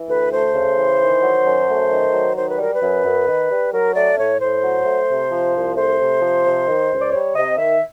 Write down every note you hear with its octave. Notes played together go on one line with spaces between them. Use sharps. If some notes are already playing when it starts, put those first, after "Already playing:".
Already playing: E3
D2 B4
A3 C5
C#3
E3
D#3
F#3
F#2
A3
D#3
F#3
D#3 C5
B4
G3 A#4
B4
F#2
F#2
D#3
G3
F#3 A#4
A3 D5
A2 C#5
A2 C5
F#3
A3
C3
F3
C2
A3 C5
C3
F3
C3
D#3
C#2
D5
G3 C#5
C3 D#5
D#3 E5